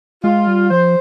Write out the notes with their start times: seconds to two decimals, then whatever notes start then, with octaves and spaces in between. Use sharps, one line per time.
0.24 G#3 F4
0.47 G3
0.71 F3 C5